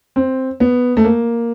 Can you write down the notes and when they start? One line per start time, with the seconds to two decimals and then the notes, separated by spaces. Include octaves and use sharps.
0.16 C4
0.60 B3
0.97 A3
1.04 A#3